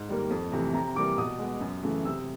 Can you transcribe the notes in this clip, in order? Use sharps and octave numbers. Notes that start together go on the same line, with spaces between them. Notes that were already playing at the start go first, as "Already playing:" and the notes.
Already playing: G#2
D#3 G3 A#3
F2
C3 E3 A3
C3 A#5
E3 G3 A#3 D6
B2 D#6
G#3 B3
F#2
C#3 E3 A3
C3 E6